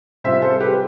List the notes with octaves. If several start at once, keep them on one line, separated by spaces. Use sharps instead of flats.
C3 G3 C4 F4 C5 E5
A4 C5
G4 B4